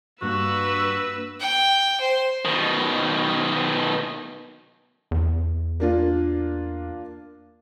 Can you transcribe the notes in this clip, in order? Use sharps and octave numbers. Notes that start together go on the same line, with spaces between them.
G2 A#3 D4 F#4 B4 E6
G5
C5
B2 D#3
E2
A#3 D4 F4